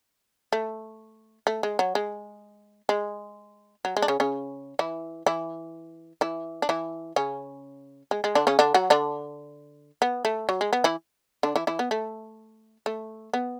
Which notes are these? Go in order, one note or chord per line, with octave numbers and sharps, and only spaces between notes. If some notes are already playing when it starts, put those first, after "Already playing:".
A3
A3
G#3
F#3
G#3
G#3
F#3
G#3
D4
C#3 C#4
C#3 C#4
E3 E4
E3 E4
E3 E4
D4
E3 E4
C#3 C#4
G#3
G#3
D3 D4
C#3 C#4
D3 D4
F#3 F#4
D3 D4
B3
A3
F#3
G#3
B3
E3 E4
D3 D4
E3 E4
E3 E4
B3
A3
A3
B3